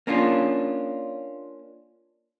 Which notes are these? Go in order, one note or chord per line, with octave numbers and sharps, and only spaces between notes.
A#3 C#4 D4 F4